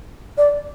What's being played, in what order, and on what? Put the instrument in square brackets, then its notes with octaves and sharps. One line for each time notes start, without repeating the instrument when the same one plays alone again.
[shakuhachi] D5